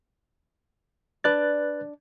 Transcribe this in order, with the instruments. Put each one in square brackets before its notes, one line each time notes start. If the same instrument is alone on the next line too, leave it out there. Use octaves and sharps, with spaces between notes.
[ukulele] D4 D5 [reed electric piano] B4 F#6 A6